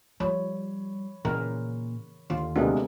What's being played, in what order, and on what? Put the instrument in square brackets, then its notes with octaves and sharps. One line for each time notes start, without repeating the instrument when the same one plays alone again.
[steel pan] F3 [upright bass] G3 [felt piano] C#5 B5
[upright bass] A#2 [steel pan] C#3 E3 A#4
[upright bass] D#2 [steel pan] D3 F4
[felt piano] D2 C3 G#3 [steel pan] A#3 B3 D4